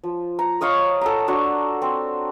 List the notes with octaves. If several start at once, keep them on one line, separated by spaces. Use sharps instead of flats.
F3
A#5
C#5 D#5 F5 C#6
A4 F#5 A#5
D4 F#4 C#6
C4